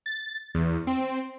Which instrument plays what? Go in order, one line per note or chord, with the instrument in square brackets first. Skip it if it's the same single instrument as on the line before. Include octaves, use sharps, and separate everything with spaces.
[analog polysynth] A6
E2
C4